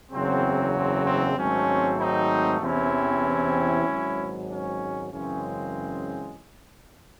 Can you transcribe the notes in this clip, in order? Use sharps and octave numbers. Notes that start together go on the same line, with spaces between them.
F#1 E2 C#3 F#3 C4
C4
C4
G#1 G#2 F#3 A3 C4 C#4
C4 D#4
E2 C3 E3 C4 C#4 E4
G#1 G#2 F#3
C#4
F#2 C#3 E3 G#3 C4 C#4